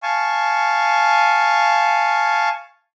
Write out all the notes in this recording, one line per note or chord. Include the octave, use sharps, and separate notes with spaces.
F5 G#5 A5 C#6